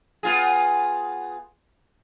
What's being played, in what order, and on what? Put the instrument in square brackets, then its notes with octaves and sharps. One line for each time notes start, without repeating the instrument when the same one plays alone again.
[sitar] B3 F4 G#4